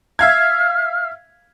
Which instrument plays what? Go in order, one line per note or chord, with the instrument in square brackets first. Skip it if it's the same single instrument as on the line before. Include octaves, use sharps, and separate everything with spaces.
[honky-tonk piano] E5 F5 G#6 [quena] F6